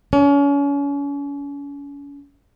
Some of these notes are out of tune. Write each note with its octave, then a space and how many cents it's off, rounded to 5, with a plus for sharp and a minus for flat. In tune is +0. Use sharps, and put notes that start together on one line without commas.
C#4 +35